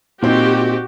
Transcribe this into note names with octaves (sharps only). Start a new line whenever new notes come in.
A#2 C4 D#4 F#4 G4